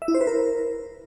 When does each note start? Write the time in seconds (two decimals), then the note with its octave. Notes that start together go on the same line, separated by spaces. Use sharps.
0.02 E5
0.08 E4
0.14 C5
0.21 B4
0.27 A#4